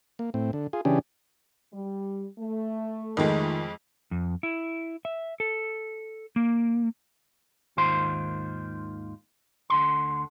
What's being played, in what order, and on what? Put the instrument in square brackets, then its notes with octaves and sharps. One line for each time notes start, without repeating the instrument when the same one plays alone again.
[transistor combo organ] A#3
A2 C4
D3
F4 G#4
C#3 E3 C#4 D4 G4 G#4
[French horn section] G3
A3
[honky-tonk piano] F2 G#3 [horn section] D#3
[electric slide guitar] F2
E4
E5
A4
A#3
[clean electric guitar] D#2 G#2 D#3 F4 C5 C6
D2 D3 C6